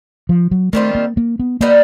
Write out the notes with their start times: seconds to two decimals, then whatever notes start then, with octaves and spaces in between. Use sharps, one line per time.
0.29 F3
0.51 F#3
0.73 D#3 G3 A3 C4 F4
0.95 A#3
1.17 A#3
1.39 B3
1.61 G3 A#3 B3 D#4